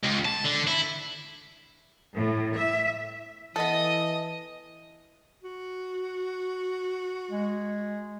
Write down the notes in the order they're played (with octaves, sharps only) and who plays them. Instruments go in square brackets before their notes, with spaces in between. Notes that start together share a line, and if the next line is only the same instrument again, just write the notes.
[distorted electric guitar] C#2
A5
D3
E4
[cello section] A2
E5
[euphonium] E3 [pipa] B3 A4 [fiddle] D#5 D#6
[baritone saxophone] F#4
[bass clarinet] G#3